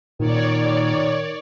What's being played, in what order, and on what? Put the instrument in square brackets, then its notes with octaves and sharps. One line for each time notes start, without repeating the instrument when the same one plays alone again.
[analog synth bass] A#2 [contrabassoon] D#3 [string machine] C#5 D5